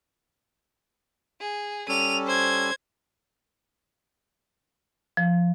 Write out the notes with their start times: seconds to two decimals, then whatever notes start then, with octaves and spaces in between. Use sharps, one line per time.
1.40 G#4
1.88 G3 C#4 A4 D#7 F7
2.27 C5 G#6
5.17 F3